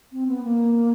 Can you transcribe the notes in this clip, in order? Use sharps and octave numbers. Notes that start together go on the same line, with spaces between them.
C4
B3
A#3